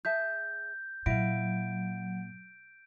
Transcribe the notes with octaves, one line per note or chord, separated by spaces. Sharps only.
G#4 E5 A5 G6
A#2 F#3 E4 F5 D7